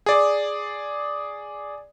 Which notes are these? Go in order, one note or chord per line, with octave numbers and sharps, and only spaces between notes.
G#4 D5